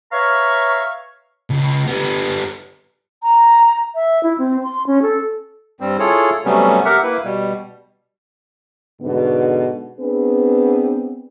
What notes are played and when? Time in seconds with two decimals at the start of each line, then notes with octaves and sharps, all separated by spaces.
0.12 B4 C#5 E5 F5 A#5 C#6
1.51 C#2
1.88 G3 B3
3.23 A#5
3.95 E5
4.23 E4
4.38 C4
4.63 C6
4.87 C#4
5.02 A4
5.80 G2 G3 C4
5.99 E4 F4 G#4 A4 C#5
6.45 C3 F#3 G3 A3 B3 C#4
6.85 G4 A#4 E5 F#5
7.03 A#3 E4 B4
7.24 B2 G3
9.01 G#2 B2 D3 B3
10.00 B3 C4 D4 G#4 B4